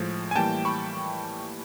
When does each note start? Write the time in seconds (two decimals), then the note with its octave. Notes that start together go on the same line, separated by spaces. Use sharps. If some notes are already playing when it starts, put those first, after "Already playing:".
Already playing: A2 F3 G#3
0.31 G#5
0.35 A2 E3 G3 A#3 G5 A5
0.65 B5 C#6